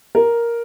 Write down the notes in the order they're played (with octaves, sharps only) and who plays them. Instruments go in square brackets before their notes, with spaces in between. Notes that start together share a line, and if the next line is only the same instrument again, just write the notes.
[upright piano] A#4